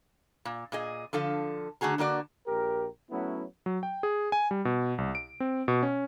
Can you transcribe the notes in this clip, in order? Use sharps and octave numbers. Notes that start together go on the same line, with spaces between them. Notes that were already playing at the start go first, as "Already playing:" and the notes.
A#2
A#2 G#4 D#5
D3 F3 A4 F5
D3 A3 F#4 G#4 A#5
D3 A#3 F#4 D5
A#1 G4 A#4
F#3 A3 B3 C#4 E4
F#3
G5
G#4
G#5
G3
B2
C2
D7
C4
B2
C#4